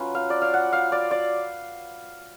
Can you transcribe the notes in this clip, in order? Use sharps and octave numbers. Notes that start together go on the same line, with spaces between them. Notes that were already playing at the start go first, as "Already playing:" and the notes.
Already playing: F#3 C#4 F4 B4
F5
D5
F5
F#5
F5
D5
D5